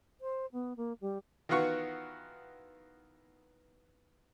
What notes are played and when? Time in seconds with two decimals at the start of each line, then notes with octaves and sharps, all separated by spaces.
0.21 C5
0.52 B3
0.76 A#3
1.01 G3
1.49 D#3 E3 B3 F4 F#4 C#6